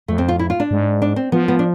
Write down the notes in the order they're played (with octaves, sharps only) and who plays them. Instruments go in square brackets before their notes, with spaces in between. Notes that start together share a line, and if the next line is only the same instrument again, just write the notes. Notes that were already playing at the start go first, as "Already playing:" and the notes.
[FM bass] F2 [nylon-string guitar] A3
[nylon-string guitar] C4
F4
E4
F4
D4
[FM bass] G#2
[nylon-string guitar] D4
C4
[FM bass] F3 [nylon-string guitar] B3
[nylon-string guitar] B3
D4